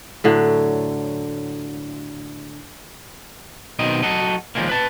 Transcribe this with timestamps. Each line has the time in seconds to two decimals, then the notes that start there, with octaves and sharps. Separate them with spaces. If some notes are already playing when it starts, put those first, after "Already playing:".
0.24 A2 D3 F#3
3.79 B1 B2 D#3 C4 D#5
4.03 F#3 F#4 A4 D#5
4.55 D#2 F3 G3 G#3 A#3
4.69 B4 A5